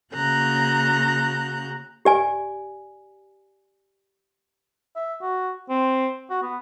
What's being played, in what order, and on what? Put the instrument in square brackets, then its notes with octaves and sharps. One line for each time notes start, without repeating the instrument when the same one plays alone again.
[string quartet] C#3 A#3 F#4 A#5 F#6 G6
[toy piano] G4 D5 G#5
[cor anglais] E5
F#4
C4
F#4
B3